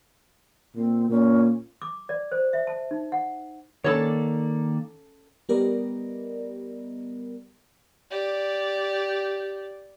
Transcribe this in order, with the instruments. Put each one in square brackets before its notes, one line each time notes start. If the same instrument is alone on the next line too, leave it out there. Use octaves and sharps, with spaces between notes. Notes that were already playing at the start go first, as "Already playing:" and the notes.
[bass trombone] A#2 [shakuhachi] C4
[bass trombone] A#2 [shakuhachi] C#4
[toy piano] D6
D5
C5
E5
A5
D#4
F#5
[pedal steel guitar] D#3 A#3 D5 [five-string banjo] C#4 A4 C#5
[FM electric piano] G3 B3 G4 A#4 D5 D#5
[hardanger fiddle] G4 D5